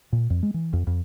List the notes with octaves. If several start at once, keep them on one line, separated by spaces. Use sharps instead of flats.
A#2
F2
G#3
E3
F2
F2